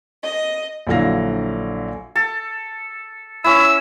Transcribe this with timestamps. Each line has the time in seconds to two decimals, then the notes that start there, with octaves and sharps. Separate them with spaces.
0.23 D#5
0.87 A#1 D3 F#3 E4 F5 A#6
2.16 A4
3.44 C#4 E4 E6